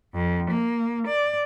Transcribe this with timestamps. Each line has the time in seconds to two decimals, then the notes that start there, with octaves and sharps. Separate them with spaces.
0.15 F2
0.50 A#3
1.07 D5